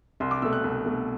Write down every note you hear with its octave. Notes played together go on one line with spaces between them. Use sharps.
C2 C6
D6
B2 A3 E6
F#6
C2
B2 A3